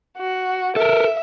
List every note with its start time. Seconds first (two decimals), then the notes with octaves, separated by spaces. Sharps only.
0.18 F#4
0.76 A4 A#4 E5